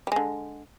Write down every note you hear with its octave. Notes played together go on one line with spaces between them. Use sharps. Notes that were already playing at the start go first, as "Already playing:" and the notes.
D3 G3 G#3